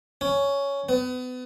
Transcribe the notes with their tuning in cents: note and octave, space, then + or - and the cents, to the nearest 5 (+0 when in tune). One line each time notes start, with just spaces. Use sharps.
C#4 +10
B3 +30